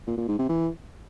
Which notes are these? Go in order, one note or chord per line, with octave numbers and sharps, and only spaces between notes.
A#2
A#2
G#2
C3
E3